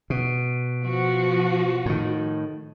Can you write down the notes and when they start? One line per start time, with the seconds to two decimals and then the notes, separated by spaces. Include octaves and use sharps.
0.10 B2
0.82 F3 F#4
1.86 A2 D#3